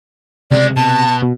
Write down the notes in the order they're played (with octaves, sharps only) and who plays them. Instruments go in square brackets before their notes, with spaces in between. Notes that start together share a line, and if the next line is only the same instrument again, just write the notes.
[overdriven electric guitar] C#2 G#3 [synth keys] C3 [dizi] D5
[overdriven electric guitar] B2 [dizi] A5
[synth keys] B2